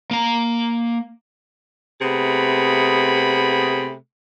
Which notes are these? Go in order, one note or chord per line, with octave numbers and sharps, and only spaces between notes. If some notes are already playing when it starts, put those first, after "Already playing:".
A#3 A#5
C3 A3 B3 G#4 B5